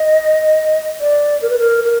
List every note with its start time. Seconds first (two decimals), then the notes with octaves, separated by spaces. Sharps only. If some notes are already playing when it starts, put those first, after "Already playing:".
Already playing: D#5
1.01 D5
1.42 A#4
1.50 B4
1.58 A#4
1.84 A#4